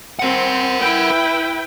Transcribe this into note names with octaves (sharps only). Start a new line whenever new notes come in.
C4 A#4 F#5
E4 B4 G5